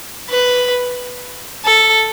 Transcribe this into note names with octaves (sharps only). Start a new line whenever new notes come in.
B4
A4